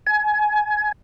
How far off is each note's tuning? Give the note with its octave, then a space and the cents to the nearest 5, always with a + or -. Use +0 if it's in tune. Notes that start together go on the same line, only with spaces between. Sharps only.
G#5 +25